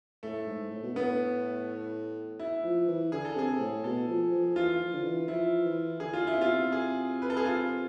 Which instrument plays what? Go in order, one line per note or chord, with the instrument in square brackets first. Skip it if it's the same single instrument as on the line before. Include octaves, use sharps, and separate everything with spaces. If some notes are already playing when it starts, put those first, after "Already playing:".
[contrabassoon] A2 [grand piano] A3
[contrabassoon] G#2
A2
B2
[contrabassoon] A2 [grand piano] B3
[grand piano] E4
[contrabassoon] F3
E3
[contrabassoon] D3 [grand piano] G#4
[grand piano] A4
[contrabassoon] C3 [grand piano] G#4
[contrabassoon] A2
[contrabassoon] B2 [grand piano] A4
[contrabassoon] F3
F3
[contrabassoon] E3 [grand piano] F4
[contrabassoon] F3
D3
E3
[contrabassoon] F3 [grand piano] E4
[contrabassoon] E3
[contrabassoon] D3 [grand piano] G#4
[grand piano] F4
E4
[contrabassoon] C3
[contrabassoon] B2 [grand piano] F4
[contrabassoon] C3
[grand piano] G#4
B4
A4
G#4
F4